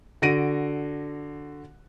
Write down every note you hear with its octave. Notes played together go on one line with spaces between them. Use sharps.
D3 F#4 A#6 D7 D#7